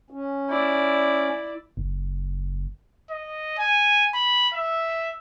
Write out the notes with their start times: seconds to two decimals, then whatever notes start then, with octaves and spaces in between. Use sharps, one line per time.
0.10 C#4
0.49 E4 D5
1.77 F#1
3.10 D#5
3.59 G#5
4.15 B5
4.54 E5